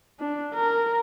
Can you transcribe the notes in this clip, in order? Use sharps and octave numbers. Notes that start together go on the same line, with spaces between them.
D4
A#4